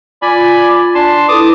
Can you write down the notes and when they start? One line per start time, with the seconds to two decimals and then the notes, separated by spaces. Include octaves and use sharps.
0.22 F4 D5 G#5 B5
0.95 D4 A5 C6
1.28 E4 A4 B4 A5 D6 D#6